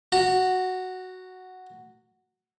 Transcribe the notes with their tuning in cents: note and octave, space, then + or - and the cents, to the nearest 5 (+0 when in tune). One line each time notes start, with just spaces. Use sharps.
F#4 +0 A#5 -35